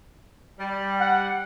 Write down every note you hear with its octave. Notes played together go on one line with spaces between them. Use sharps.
G3
F#5